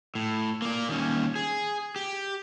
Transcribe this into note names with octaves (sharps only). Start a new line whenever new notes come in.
A2
A#3 D5
D#2 C#4
G#4
G4